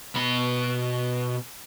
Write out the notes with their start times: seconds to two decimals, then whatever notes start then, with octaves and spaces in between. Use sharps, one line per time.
0.15 B2 B5